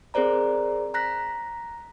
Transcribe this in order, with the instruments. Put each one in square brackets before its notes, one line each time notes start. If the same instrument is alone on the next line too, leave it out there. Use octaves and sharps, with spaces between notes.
[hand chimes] C4 G#4 A#4 C5 D5 A#5
A#5 F#6 A#6 B6